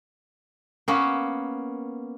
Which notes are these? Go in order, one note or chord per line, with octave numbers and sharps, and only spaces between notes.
A#3 B3 C#4